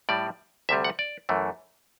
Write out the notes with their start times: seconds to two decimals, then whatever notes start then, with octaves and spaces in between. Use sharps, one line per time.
0.09 A2 G3 D5
0.69 D2 C3 G3 E5
0.84 F#5
0.99 D5
1.29 F#2 E3 A3